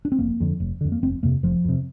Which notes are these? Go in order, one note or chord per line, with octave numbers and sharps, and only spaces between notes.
D4
C4
F1 A#3
F2 D3
F1
F2 D3
A#3
F1 C4
F2 C3 A#3
F1 F3
F2 C3